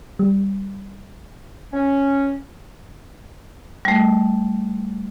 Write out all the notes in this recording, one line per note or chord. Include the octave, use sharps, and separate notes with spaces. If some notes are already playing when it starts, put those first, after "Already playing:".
G3
C#4
G3 A3